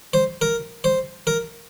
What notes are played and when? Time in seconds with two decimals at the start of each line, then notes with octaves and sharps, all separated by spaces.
0.14 C5
0.42 A#4
0.84 C5
1.27 A#4